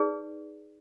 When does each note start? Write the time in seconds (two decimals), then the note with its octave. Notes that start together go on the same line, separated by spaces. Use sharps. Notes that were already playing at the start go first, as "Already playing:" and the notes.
Already playing: D#4 G#4 B4 D5